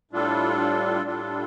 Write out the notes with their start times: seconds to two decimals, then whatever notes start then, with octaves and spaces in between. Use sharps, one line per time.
0.11 A2 G3 D4 F4 A4
1.03 A2 G3 D4 F4 A4